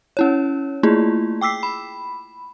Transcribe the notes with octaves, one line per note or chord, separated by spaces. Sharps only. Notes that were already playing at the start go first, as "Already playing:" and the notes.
C#4 E4 C#5
A3 A#3 E4 F4 G#4
G5 D6 E6 B6 C7
B5